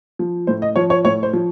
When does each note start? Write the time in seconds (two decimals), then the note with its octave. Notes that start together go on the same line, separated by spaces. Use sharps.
0.19 F3
0.47 A2 C5
0.62 D#5
0.76 F3 C#5
0.90 C#5
1.05 A2 C#5
1.23 C5
1.33 F3